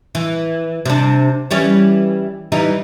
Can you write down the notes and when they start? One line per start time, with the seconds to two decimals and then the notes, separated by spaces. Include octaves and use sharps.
0.15 E3
0.86 C3 D4
1.51 E3 G3 C#4
2.52 E3 G3 D#4